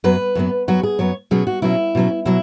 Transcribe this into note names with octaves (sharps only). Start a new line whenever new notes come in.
F#2 F#3 B3 B4
F#2 F#3 B3
F#2 F#3 B3 F#4
G#4
F#2 F#3 B3 C#5
B2 F#3 C#4 G#4
F#4
B2 F#3 C#4 E4
B2 F#3 C#4
B2 F#3 E4